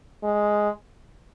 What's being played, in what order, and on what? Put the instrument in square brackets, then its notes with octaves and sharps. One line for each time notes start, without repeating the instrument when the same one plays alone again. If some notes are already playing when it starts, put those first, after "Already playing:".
[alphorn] G#3